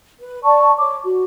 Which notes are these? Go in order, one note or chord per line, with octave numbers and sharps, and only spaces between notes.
B4
D5 A5 C#6
C#5 D6
F#4